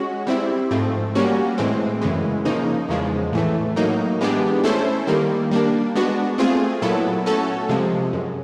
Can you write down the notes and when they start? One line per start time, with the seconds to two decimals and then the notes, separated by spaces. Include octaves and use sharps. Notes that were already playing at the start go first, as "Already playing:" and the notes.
Already playing: G#3 C#4 F#4
0.27 G3 C4 E4
0.71 G#2 F3 A3 C4
1.15 G3 A#3 C#4 F#4
1.58 A2 E3 G#3 C4
2.02 F#2 C#3 E3 G#3
2.45 C#3 F3 A#3 D#4
2.89 E2 C#3 F3 G#3
3.33 A2 E3 A3
3.76 A2 F#3 A#3 D#4
4.21 E3 G#3 B3 D4 G4
4.64 A3 C#4 E4 A4 C5
5.07 D#3 G3 A#3
5.51 G3 A#3 D4
5.95 G#3 B3 D4 F#4
6.38 A3 C4 F4 G#4
6.82 A#2 F#3 B3 E4 A4
7.26 A3 C#4 F#4 A4
7.69 C3 F3 G#3
8.13 F#2